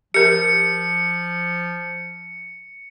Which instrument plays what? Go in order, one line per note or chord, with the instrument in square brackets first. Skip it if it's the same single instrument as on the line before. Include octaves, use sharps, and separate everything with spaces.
[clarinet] F3 [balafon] G4 A#4 [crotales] C#7